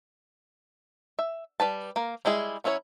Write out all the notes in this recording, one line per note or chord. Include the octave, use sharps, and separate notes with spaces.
E5
G3 B4 A5
A#3 A#4
G3 G#3 E4 G#4
F#3 C#4 E4 A4 C#5